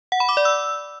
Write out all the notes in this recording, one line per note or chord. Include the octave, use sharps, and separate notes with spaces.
F#5
B5
D6
D5
E6